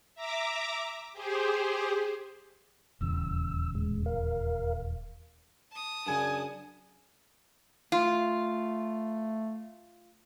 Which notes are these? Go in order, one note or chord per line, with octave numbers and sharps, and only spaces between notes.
E5 A#5 D6
G4 G#4 C5
D#1 E2 C#3 E6
A2 G#3
A#4 F5
A5 D#6
F#2 C#3 D4 G#5
A3 F4